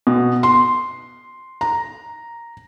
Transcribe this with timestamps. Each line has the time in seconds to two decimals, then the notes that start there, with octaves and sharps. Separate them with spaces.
0.07 B2
0.43 C6
1.61 A#5